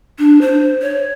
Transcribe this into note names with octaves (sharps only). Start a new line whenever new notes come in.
D4
C5
C#5